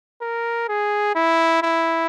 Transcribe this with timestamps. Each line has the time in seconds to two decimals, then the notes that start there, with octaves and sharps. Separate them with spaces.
0.21 A#4
0.68 G#4
1.15 E4
1.63 E4